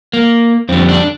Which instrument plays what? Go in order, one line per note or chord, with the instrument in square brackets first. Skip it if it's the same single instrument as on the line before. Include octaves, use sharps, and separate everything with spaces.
[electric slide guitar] A#3
F2 D3 G3 C4
D4